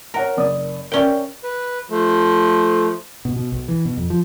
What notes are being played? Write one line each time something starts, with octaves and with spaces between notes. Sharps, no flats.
A#4 C#5 F#5 A#5
F#1 D5 D#6
C#4 A#4 D5 E5 G5
B4
F3 A3
B2
B2
B1
E3
B2
F2
F3